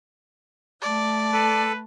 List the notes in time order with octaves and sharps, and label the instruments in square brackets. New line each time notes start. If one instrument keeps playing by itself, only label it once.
[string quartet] A3 A5 [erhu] D5
[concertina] A4 [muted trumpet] B4